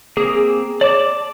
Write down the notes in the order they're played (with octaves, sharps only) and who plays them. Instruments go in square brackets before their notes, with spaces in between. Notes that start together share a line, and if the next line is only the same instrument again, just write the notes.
[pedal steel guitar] A#3 C4 [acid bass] G#4
[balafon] C#5 [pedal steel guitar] D5 A5 D6